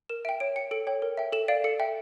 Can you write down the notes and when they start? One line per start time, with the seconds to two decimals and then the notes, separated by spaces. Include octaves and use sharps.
0.09 A#4 E7
0.25 E5 G5 D7
0.40 C#5 D7
0.56 G5 C#7
0.71 A4 D7
0.87 C#5 G5
1.02 A#4
1.17 E5 G5
1.32 A4 E7
1.48 D5 F5 D7
1.64 A4 C#7
1.80 E5 G5